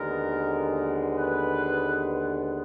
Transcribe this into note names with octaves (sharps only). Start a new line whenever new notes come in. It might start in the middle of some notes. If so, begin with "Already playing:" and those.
Already playing: D#2 D3 G#3 B3 A#4
B4